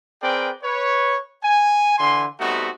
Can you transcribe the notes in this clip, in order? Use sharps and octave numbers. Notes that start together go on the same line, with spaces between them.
C4 G#4 A#4 B4 D5 G5
B4 C#5
G#5
D3 E3 G#5 C6
G3 A3 B3 C4 D#4 F#4